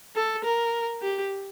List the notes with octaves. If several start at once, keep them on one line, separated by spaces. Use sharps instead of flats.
A4
A#4
G4